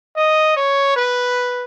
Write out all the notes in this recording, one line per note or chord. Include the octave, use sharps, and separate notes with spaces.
D#5
C#5
B4